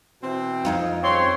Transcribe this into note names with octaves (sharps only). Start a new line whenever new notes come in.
B2 E3 C4
F2 D#4 F4
C#3 C4 C#5 C6